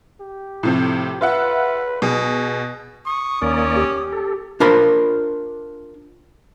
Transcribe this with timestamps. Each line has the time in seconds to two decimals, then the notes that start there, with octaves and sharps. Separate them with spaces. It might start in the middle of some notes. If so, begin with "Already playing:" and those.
0.20 G4
0.63 A2 C3 F3
1.21 F4 B4 E5 F#5
2.02 B2 G#4
3.06 C#6 D#6
3.42 D#2 A#3 C#4 D5
3.76 G4
4.12 A4
4.60 D4 F4 A#4 C5 B5